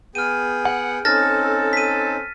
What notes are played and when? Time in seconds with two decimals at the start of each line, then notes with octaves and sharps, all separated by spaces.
0.15 B3 G#4 G5 F6 D#7
0.65 F#5
1.05 C4 C#4 D#4 A4 F6 A6 A#6
1.73 B6 D#7